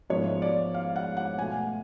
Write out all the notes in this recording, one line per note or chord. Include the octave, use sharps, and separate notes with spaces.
G#2 F3 B3 C#5
D5
F5
F#5
F#5
B2 A3 G#5